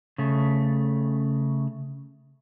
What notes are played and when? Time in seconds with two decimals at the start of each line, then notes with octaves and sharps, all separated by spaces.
0.18 C#3 A3